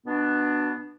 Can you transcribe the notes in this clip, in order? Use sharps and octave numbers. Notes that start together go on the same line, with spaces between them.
B2 B3 D4